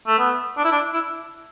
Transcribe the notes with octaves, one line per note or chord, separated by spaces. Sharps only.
A3
B3
D4
E4
D4
E4